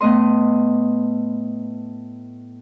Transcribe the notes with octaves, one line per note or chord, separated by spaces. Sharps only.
A2 A3 B3 D#5 C6